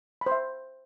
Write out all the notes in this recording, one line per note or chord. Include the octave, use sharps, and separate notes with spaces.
B5
C5
E5